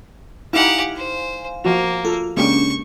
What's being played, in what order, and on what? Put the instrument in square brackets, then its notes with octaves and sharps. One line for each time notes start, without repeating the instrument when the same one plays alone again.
[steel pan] D#4 E4 [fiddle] G4 F#5 [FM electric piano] F5 G#5
[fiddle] C5
[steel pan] F3 F#4 [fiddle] A#3
[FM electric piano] F4 [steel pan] A4
[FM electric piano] C#3 C#4 D4 [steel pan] G#3 A#3 G4 [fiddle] C#6